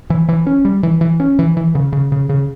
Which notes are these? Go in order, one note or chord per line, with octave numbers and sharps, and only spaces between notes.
E3
E3
C#4
G3
E3
E3
C#4
E3
E3
C#3
C#3
C#3
C#3